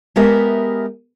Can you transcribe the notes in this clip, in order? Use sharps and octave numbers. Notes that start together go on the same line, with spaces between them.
G#3 B3 G4 A#4 E5